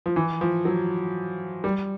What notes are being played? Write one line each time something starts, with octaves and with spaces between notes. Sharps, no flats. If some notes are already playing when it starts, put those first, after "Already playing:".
F3
E3
F3
F#3
G3